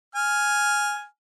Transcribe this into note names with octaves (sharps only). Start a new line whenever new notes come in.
G#5 F6